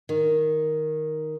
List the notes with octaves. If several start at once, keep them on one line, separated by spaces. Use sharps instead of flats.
D#3